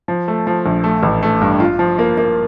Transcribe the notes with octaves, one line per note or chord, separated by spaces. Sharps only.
F3
A3
F3
A#1
A3
A1
A3
G2
F4
F3
A#3
A#3